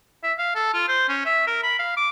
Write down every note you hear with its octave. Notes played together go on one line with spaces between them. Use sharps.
E5
F5
A4
F4
C5
C#4
E5
A#4
B5
F5
D6